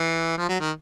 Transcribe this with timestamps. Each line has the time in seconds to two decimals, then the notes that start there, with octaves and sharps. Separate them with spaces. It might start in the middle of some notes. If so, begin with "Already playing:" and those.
Already playing: E3
0.38 F3
0.49 F#3
0.60 D#3